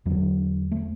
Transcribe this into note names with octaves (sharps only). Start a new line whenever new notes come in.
E2 D3 F#3
A3